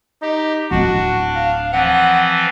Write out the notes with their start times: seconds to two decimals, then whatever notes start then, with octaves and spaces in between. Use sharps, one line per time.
0.22 D#4 G4
0.71 D1 D4 E4 F#4
1.36 F5
1.73 E3 F3 C4 F#5